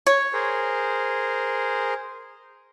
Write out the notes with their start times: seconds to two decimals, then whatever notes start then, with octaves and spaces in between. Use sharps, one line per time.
0.07 C#5
0.33 G#4 A#4 C5